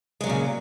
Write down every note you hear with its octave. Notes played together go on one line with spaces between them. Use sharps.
A#2 C#3 F#3 G#3